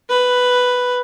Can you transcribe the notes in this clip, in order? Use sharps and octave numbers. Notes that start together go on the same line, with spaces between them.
B4